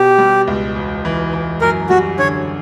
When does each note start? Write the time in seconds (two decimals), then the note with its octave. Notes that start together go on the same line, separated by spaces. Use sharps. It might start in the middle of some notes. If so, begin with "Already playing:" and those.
Already playing: B2 G4
0.18 G3
0.47 C#2
0.76 E1
1.05 E3
1.33 E3
1.61 F#2 A#4
1.89 G3 F#4
2.19 D3 C#5